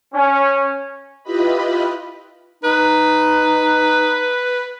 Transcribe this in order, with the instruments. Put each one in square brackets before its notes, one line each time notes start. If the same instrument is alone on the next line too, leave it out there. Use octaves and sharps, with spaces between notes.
[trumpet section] C#4
[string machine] E4 F4 G4 B4 D#5 B5
[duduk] D#4 [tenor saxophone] B4